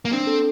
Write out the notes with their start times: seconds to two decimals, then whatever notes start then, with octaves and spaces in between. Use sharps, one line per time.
0.05 A#3
0.12 C4 D4
0.27 A4